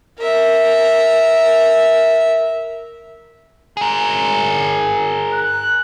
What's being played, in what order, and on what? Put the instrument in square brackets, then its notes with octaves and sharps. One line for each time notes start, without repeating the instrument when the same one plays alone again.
[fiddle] A#4 E5
[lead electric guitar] G#4 A#4
[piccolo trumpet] F#6